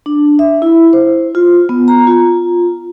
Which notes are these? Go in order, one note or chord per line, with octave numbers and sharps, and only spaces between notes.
D4
E5
E4
C5
F4
B3
A#5
F4